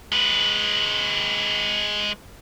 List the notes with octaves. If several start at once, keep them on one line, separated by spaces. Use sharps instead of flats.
G#3 B4